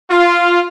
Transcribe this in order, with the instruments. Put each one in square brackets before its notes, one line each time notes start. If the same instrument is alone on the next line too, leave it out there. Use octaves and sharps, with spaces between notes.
[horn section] F4